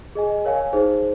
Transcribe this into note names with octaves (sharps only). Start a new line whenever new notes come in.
G#4 D#5 G#5
A#4 C#5 F5 G#5
D#4 G#4 C5